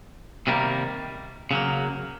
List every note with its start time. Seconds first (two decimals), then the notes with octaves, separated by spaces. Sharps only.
0.47 C3 D#3 G3 A#3
1.51 C#3 F#3 A#3